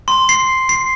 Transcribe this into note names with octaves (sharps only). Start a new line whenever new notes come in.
C6
C7
C7